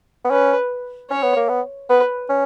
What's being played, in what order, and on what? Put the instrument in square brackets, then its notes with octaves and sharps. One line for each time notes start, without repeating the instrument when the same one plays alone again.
[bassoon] B3
[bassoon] C#4 [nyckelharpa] B4
[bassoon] C#4 [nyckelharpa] C#5
[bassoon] B3
A#3
B3
[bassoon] B3 [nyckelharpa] B4
[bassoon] C#4